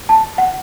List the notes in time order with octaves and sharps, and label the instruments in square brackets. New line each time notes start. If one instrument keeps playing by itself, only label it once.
[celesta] A5
F#5